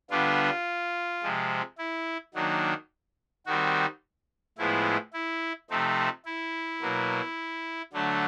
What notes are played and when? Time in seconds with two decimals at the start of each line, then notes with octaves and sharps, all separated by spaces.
0.10 D3 G3 B3 D4 F4
1.23 C3 F3 G#3
1.79 E4
2.34 D#3 F#3 A#3 D4
3.46 D#3 G3 C4 F#4
4.58 A2 F3 G#3 B3 E4
5.14 E4
5.70 C3 F3 A3 C4 D#4
6.26 E4
6.81 B2 F#3 A#3
7.93 D3 F#3 A3 D4